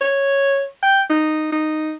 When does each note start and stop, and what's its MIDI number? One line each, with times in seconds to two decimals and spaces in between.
0.01 0.64 73
0.83 1.02 79
1.10 1.49 63
1.52 1.94 63